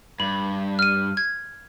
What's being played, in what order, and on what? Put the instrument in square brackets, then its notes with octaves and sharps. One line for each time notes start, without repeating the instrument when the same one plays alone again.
[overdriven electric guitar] G2 [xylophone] B5
[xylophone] F6 D#7
G#6